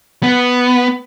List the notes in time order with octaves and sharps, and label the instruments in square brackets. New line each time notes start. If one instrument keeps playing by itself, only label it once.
[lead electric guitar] B3